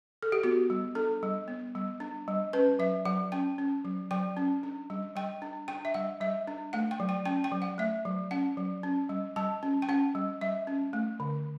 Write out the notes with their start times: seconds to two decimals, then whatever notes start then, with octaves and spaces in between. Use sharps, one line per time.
0.23 A4
0.32 G4
0.43 B3 F#4
0.70 G3
0.95 D4 A4
1.23 G3
1.48 B3
1.75 G3
2.00 D4
2.28 G3
2.53 C#4 B4
2.79 F#3 E5
3.05 F#3 F#5
3.32 C#4 G5
3.58 C#4
3.85 F#3
4.11 F#3 G5
4.37 C#4
4.63 D4
4.90 G3
5.16 G3 G5
5.42 D4
5.68 D4 G5
5.85 E5
5.94 G3 F#5
6.21 G3 E5
6.47 D4
6.73 A3 F#5
6.91 G5
7.00 F#3
7.09 G5
7.25 C#4 G5
7.44 G5
7.52 F#3
7.62 F#5
7.78 A3 E5
8.05 F#3
8.31 C#4 F#5
8.57 F#3
8.83 C#4
9.09 G3
9.36 G3 A5
9.63 C#4
9.82 G5
9.89 C#4 F#5
10.15 G3
10.41 G3 E5
10.67 C#4
10.93 A3
11.20 D3